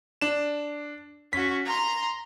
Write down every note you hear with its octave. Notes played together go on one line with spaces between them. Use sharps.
D4 E7
C#4 F#4 B6
A#5 C6